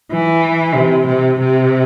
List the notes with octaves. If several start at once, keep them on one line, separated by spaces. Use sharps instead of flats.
E3
C3
C3
C3